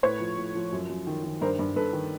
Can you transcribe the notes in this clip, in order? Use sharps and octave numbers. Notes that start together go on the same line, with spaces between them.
A2 B4 C#5
F3
A2
F3
F#2
F#2
D#3
D#3
G2 A#4 C5
G2
G2 A4 B4
D#3